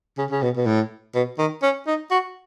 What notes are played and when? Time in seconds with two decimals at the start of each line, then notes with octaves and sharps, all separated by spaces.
0.18 C#3
0.30 C#3
0.42 B2
0.56 B2
0.66 A2
1.15 B2
1.38 D#3
1.62 C#4
1.87 D#4
2.11 F#4